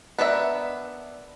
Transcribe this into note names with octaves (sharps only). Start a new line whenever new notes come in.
B3 D4 A#4 D5 E5